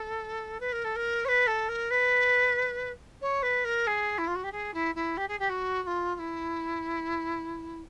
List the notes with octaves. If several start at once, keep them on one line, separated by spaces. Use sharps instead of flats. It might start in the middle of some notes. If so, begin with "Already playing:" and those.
Already playing: A4
B4
A#4
A4
A#4
C#5
B4
A4
A#4
B4
C#5
B4
A#4
G#4
E4
F4
F#4
G4
G#4
E4
E4
G4
G#4
G4
F#4
F#4
F4
F4
E4